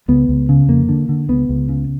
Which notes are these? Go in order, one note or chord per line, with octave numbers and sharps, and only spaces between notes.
C#2 B3
C#2
C#3
F2 A#3
D3
D3
C#2 B3
C#2
C#3